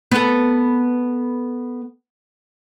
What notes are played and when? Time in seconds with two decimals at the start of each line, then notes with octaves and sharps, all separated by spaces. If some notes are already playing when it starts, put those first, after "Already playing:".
0.12 B3 A4